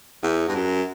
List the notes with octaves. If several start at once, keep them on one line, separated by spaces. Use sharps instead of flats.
E2
G2
F#2